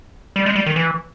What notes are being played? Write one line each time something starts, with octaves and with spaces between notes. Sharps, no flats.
G3
G#3
G3
D#3
E3